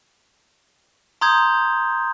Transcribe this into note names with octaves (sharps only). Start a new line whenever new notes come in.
A#5 C6 D#6 G6 G#6